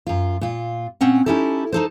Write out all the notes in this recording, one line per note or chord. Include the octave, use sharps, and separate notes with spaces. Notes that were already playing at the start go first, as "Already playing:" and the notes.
F#2 F4
A#2 F4
A#2 C4 C#4 F#5
C#4 D#4 E4 G4 A4
D#4 A4 C5